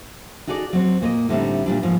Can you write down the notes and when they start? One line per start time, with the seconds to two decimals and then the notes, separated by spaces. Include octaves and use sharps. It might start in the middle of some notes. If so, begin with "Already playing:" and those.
0.47 D#4 F#4 G#4 A4 D5
0.73 F#3 C4
1.01 A#2 A#3 C#5 D#5
1.29 A2 D3 G3 C4 D#4 E5
1.66 A#2 G3 D4
1.82 G#2 F3 A#3 B3